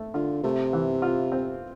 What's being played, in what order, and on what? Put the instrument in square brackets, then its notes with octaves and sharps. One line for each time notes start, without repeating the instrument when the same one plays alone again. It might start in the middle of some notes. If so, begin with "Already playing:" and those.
Already playing: [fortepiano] A3
[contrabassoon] D3 [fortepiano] F4
[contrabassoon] C3 [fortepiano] A3
[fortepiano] E3
F4
C4